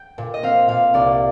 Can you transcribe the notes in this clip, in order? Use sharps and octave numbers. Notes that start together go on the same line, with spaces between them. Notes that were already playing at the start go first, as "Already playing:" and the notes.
Already playing: G5
A#2
D#5
C4 F5
A#2 F5
C2 D5